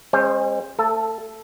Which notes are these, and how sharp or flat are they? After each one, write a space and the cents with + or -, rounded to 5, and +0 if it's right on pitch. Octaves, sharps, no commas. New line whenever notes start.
G#3 -25 C#4 -40 C5 +0
A3 +30 A4 +0